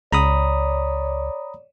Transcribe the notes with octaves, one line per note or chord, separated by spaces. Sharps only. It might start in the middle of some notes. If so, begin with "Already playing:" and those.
C#2 C#5 D5 A#5 B5 D#6